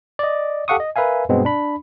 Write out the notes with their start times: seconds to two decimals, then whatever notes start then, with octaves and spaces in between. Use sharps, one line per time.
0.19 D5 D#5
0.68 G4 A4 F5 F#5 C#6 D#6
0.80 D#5
0.96 A#4 B4 E5 F5 G#5
1.29 G2 B2 G#3 B3 C4
1.45 D4 B5